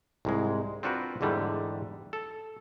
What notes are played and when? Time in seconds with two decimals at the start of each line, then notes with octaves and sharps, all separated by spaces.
0.25 C2 G#2 G#3
0.83 C4 D4 F4 F#4 A#4 B4
1.21 E2 G#2 D3 G3 A3
2.13 A4